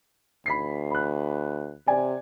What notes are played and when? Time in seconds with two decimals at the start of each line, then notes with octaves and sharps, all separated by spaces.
0.46 D2 B5 B6 C7
0.91 B5 F#6
1.87 C3 D5 G#5